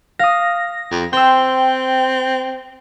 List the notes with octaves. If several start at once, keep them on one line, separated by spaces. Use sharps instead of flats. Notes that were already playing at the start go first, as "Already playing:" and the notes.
F5 D#6 A#6
F2
C4 C5 G5 E6